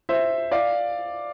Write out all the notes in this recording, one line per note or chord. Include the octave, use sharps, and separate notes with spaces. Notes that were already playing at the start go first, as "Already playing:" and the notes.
C5 E5
D5 F5